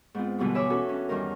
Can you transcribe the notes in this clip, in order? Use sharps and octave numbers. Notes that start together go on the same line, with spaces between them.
G#2 B3 C4 F4
E2 G2 B2 D3 E3 G3
B4 C#5 E5 G#5 D6 E6
C#4 F#4 A4 B4
C#4 D4
E2 G2 D#3 A#4